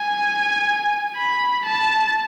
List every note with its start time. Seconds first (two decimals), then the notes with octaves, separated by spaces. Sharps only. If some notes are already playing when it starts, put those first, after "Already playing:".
Already playing: G#5
1.16 B5
1.65 A5